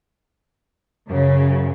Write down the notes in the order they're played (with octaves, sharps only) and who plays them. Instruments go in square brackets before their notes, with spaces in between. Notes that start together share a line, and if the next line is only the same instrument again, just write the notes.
[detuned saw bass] F#2 [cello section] C#3